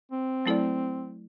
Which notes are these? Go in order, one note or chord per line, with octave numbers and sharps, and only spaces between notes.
C4
F#3 A3 E4 A4 D5